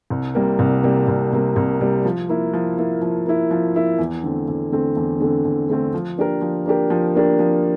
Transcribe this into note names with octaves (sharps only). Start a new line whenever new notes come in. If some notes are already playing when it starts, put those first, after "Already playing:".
C2
C3 G3 A#3
C2
C3 G3 A#3
C2
C3 G3 A#3
C2
C3 G3 A#3
F3
A#3 E4
F3
A#3 E4
F3
A#3 E4
F3
A#3 E4
E2
D3 A3 C4
E2
D3 A3 C4
E2
D3 A3 C4
E2
D3 A3 C4
F3
A#3 D4 G4 A#4
F3
A#3 D4 G4 A#4
F3
A#3 D4 G4 A#4
F3